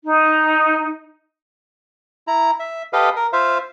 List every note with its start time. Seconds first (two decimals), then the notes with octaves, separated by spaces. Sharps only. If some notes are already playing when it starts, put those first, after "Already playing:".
0.04 D#4
2.27 E4 A#5
2.60 E5
2.93 G4 A4 B4 D#5 F5
3.16 A#4
3.33 F4 C5 E5 F5